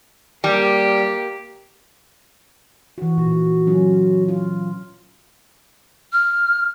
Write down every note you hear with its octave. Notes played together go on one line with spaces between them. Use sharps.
G3 A#3 G4
E3 F#4
A#2 F#4
F#3 C#4 F4
F4
F6